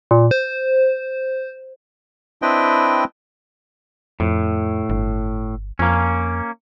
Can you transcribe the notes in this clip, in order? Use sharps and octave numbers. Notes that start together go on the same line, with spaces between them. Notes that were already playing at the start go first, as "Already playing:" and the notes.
A#2
C5
C4 D4 E4 B4 D#5 G5
F2 A2
G1
F2 A#3 C#4